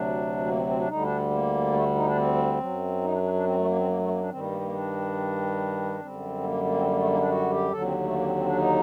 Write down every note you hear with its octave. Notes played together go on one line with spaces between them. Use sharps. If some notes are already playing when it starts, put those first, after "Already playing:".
Already playing: D2 C3 F#3 D4
A#3
C4
C4
D4
D2 D3 G3 D#4
D4
A#3
A3
D#4
D4
C4
F#2 F#3
D#4
D4
D4
D4
C4
A3
A#3
C4
A#3
A3
A#3
D4
G2 D#3 G3 C4
A#3
A#3
A#3
D4
F#2 D3 G3 C4
A#3
A#3
C4
A#3
A3
A#3
D#4
D4
F#4
G4
D#2 D3 F#3 A4
C4
A3
A#3
C4
C4
D4
D#4